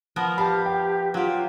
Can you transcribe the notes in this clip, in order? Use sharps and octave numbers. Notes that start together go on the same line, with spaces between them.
F3 B3 A#4
G4 F5 A5 B5
G5
F#3 F4 G4